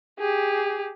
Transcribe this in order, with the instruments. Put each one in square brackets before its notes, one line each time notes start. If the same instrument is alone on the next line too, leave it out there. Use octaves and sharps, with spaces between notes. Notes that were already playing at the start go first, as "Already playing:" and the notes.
[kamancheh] G4 G#4